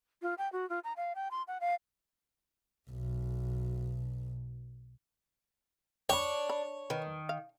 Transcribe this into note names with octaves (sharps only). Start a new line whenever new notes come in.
F4
G5
F#4
F4
A#5
F5
G5
C6
F#5
F5
B1 B2
D4 C#5 G5 B5
B5
D#3 B4
F5